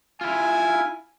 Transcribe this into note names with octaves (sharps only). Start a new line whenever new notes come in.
E4 F4 G#5